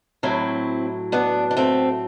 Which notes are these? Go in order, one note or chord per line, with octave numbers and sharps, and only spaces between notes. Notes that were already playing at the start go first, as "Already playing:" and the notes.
A2 F#3 C4 E4
B3 D4
D4
A3 C4